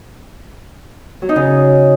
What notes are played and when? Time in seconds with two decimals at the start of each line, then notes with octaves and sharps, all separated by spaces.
1.22 F#3
1.29 D#4
1.36 C#3